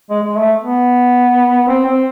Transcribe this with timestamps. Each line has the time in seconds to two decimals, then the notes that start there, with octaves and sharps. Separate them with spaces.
0.10 G#3
0.23 G#3
0.37 A3
0.62 B3
1.68 C4
1.86 C4